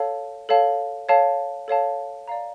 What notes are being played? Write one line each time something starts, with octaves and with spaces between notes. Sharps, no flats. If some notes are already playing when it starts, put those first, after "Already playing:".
Already playing: A4 C#5 F5 A5
A4 C#5 F5 A5
A4 C#5 F5 A5
A4 C#5 F5 A5
D5 F5 A#5